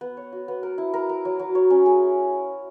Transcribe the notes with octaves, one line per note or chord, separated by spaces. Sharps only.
B3
C#5
F#4
B3
A#4
E4
A#4
A#4
F#3
F#3
C#5
C#4
G#4